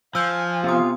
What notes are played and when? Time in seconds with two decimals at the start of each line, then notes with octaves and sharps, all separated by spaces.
0.15 F3 F5 G#5 E6 G6
0.64 C3 B3 F4 D#6